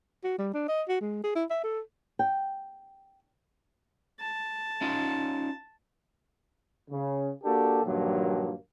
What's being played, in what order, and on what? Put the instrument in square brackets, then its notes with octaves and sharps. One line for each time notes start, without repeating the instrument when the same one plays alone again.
[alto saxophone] F#4
G3
D4
D#5
F#4
G#3
G#4
E4
E5
A4
[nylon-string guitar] G5
[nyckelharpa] A5
[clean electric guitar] C#4 D#4 F4
[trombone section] C#3
A#3 D4 F#4 G4 A4
G2 A#2 D#3 F3 F#3 A#3